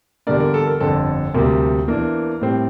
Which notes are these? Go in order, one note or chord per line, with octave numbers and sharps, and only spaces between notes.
E2 D3 G3 A#3 D4 A#4 D5
A#4
A4
A#4
G1 F2 D3 A4
D2 C3 G3 A#3
E2 E3 A#3 D4 A#4
A2 G3 C4